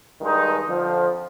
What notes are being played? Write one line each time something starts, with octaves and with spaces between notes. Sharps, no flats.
G2 D#3 G#3 D#4
F2 D3 F3